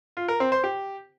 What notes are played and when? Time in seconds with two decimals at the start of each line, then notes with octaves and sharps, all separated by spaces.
0.17 F4
0.28 A#4
0.40 C4
0.52 C5
0.64 G4